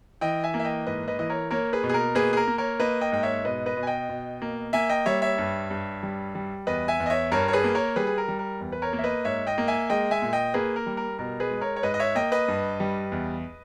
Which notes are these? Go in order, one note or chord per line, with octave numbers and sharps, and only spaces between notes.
E3 D#5 G5
E5 G#5
A#3
E5
D#5 G5
G#2 B4 D#5
B4 D#5
E3 D#5
A#4 C#5
A#3 A#4 C#5
G#4 B4
B2
G#4
A#4
A#3 G#4 B4
G#4
A#4
A#3
A#4 C#5
A#3 B4 D#5
D#5 G5
G#2 G5
C#5 E5
B2 B4 D#5
B4 D#5
B2
G#5
D#5 G5
B2
A#3
A#3 E5 G#5
D#5 G5
G3 C#5 E5
C#5 E5
G2
G2
G3
G3
E2 B4 D#5
E5 G#5
E2
D#5
C#5 E5
G2 A#4 C#5
C#5
G#4 B4
A#3
A#4 C#5
G3 G#4 B4
G#4
A#4
G3
A#4
E2
B4
A#4 C#5
A#3
E5
B4 D#5
G#2 C#5 E5
D#5 G5
A#3
E5 G#5
G#3 D#5 G5
E5 G#5
A#2
D#5 G5
A#3 G#4 B4
A#4
G3
A#4
B2 A#4
G#4 B4
G#3
A#4 C#5
C#5
G#2 B4 D#5
D#5
C#5 E5
A#3 D#5 G5
B4 D#5
G2
G3
E2